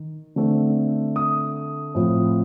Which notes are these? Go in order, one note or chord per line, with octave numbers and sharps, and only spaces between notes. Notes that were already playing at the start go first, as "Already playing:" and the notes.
Already playing: D#3
D3 A3 C4
D#6
A2 F3 C4